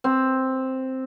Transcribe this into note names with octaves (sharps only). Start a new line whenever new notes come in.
C4